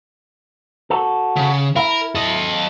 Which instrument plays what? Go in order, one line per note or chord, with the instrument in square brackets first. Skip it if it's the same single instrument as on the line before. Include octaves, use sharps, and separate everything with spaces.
[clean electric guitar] F#4 A4
[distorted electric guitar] C#3
[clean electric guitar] E4 [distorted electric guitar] A#4
[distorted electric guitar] A4 D#5